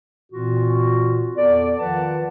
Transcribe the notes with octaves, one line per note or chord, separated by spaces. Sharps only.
A#2 E3 C4 F4 F#4
E2 B3 A4 D5
D#3 F3 F4 B4 F#5 A5